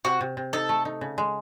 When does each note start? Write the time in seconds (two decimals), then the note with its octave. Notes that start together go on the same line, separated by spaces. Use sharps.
0.05 C3 F#4
0.21 C3
0.37 C3
0.53 D#4 A4
0.69 A3
0.85 D#4
1.01 C#3
1.18 G#3